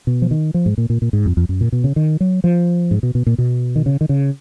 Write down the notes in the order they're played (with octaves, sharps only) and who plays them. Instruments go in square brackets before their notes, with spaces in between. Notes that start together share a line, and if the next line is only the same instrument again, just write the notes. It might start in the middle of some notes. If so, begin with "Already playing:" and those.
[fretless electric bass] B2
F3
D#3
F3
G#2
A#2
A#2
A#2
G#2
F2
F2
F#2
A#2
B2
C#3
D#3
F#3
F3
G#2
B2
B2
A#2
B2
D#3
C#3
D#3
C#3